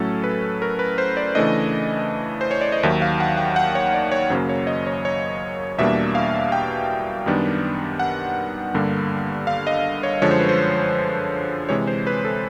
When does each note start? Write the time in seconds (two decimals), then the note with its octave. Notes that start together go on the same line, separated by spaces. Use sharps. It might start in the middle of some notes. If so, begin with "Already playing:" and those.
Already playing: A2 F#3 A3 C#4 A4
0.24 B4
0.62 A#4
0.79 B4
0.98 C5
1.17 D5
1.35 C#3 E3 A3 D4 D#5
2.41 C5
2.51 C#5
2.61 D5
2.72 D#5
2.83 D#2 D#3 F#3 E5
3.02 F5
3.20 F#5
3.38 G5
3.56 F#5
3.75 C#5
3.94 D5
4.12 C#5
4.30 F#2 C#3 F#3 A#3 C5
4.49 C#5
4.67 D#5
4.87 C#5
5.05 C#5
5.78 E2 B2 G3 A#3 D4 E5
6.15 F5
6.52 G5
7.26 F#2 D#3 G3 B3 D4
7.99 F#5
8.74 G2 D3 G3 A#3
9.47 F5
9.67 D#5
10.03 C#5
10.22 F#2 D3 F3 G#3 C#5
10.31 C5
10.39 B4
10.49 C5
11.69 C3 E3 G#3 C#5
11.87 C5
12.07 B4
12.25 A4